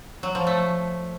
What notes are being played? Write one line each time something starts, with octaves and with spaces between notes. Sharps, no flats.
F#3
F3
A3